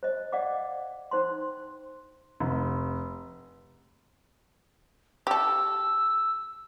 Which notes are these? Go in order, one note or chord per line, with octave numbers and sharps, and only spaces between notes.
C5 D#5
D5 D#5 F5 F#5 D6
D#4 C5 G5 C6
F1
G4 A4 E6